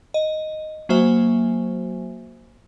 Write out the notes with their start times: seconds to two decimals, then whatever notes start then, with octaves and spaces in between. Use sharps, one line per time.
0.14 D#5
0.89 F#3 A#3 F#4 C5 E5 G#5